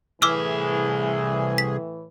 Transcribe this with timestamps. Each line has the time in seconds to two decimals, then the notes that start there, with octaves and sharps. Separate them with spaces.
0.22 C2 A2 E3 G#4 E5 D6 E6 F6
1.58 B6